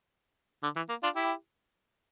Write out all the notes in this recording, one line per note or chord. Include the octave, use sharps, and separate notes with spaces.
D3
E3
A#3
D4 F4
E4 G4